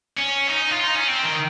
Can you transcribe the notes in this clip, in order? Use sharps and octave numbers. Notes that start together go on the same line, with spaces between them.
C#4
D#4
F4
D#4
C#4
C4
D#3